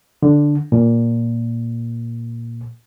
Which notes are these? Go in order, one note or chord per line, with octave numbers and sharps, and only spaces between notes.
D3
A#2